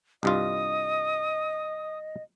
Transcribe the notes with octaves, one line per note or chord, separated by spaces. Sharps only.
C2 G2 F4 D#5 D#6